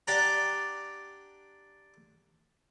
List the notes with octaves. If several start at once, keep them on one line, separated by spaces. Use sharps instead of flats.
D4 G4 D5 F#5 G5 A#5